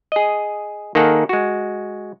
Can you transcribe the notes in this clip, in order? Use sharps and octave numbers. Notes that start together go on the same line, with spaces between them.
G#4 D#5
D#3 A#3 G#4 A4 F#5
G#3 F#4